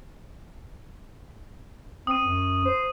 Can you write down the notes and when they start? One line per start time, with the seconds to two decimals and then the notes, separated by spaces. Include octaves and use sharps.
2.07 C4 D#6 D#7
2.25 F#2
2.65 C5